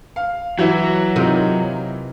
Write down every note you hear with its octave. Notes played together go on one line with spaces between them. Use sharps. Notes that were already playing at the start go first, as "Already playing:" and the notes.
F5
E3 F#3 E4 F#4
C3 D#4 F4 A#4